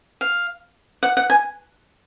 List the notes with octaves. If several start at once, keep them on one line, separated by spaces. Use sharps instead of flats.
F5
F#5
F#5
G#5